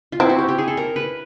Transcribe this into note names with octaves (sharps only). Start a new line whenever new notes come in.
F4
C4 E4
F#4
G4
G4
G#4
A4
A#4
B4